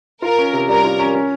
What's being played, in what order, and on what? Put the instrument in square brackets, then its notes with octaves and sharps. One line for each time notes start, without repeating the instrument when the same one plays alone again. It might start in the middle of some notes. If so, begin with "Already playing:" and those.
[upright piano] F4 [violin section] A#4
[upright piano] C#4
C3
[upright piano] G3 [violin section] A#4
[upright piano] F4
C#4
C#4